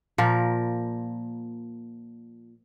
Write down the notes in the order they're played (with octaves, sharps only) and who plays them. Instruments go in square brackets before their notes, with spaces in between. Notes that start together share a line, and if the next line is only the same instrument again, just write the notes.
[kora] A#2 F3 A#4